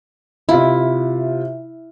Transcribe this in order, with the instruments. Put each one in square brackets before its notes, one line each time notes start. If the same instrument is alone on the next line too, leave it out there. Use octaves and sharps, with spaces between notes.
[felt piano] C3 F4 F5 [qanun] E4